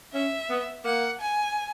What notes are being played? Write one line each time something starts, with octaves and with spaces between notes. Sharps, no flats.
C#4 E5
B3
A#3 F#5
G#5